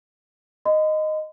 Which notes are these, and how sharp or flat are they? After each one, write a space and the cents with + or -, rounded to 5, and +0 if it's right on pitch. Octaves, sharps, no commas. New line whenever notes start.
D#5 -5 C6 -45